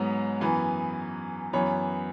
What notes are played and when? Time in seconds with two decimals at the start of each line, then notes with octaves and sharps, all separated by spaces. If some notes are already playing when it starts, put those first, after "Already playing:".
Already playing: G#2 F#3 B3
0.41 F#2 E3 B3 G#5
1.53 F#2 E3 B3 C#5